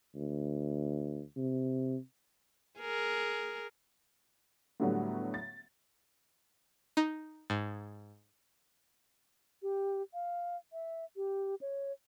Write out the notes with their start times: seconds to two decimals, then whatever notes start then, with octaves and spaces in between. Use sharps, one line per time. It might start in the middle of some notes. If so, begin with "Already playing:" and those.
0.15 D2
1.36 C3
2.79 G#4 A#4
4.80 A2 D3 F#3 G3 B3
5.34 A6
6.97 D#4
7.50 G#2
9.62 G4
10.14 F5
10.73 E5
11.16 G4
11.61 C#5